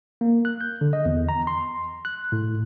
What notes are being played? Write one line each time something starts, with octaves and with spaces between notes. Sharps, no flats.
A#3
F#6
G6
D3
D#5
E2
A#5
C6
F#6
A2